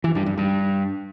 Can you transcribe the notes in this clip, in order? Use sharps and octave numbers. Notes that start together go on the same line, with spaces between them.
E3
G2
G2
G2